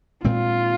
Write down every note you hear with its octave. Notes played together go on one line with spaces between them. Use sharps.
A#2 G#3 C4 F4